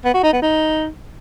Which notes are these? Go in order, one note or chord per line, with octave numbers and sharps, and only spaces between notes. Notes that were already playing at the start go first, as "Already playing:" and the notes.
B3
F#4
D#4
B3
D#4